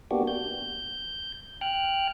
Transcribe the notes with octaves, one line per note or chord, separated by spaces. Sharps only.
A#3 B3 D4 F#4 G4
G6
G5 F6 F#6